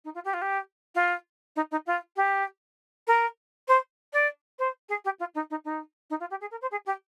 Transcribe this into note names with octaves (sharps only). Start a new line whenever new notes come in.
D#4
F4
G4
F4
G4
F4
D#4
D#4
F4
G4
A#4
C5
D5
C5
G#4
G4
F4
D#4
D#4
D#4
D#4
F4
G4
G#4
A#4
C5
G#4
G4